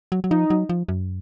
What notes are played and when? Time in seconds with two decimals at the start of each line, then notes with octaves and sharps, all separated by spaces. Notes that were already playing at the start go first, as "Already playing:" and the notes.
0.12 F#3
0.24 F#3
0.31 F3 D#4
0.50 F#3
0.69 F3
0.88 F#2